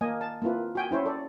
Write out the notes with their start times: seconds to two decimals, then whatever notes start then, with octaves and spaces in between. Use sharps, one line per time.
0.01 A#3 D#5 G#5
0.21 A5
0.42 A#3 C4 E4 F4 B4
0.75 F#4 G5 G#5
0.91 C#4 E4 C5 C#5
1.06 A4 D5